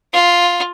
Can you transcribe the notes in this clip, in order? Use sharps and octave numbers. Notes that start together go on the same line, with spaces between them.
F4